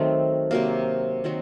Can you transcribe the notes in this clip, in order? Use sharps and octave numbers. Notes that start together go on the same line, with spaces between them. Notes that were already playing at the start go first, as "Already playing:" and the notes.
Already playing: D#3 F#3 A3 C4
C3 F#3 A#3
D#3 F#3 C4 F#4